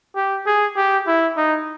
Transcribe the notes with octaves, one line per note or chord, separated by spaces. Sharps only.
G4
G#4
G4
E4
D#4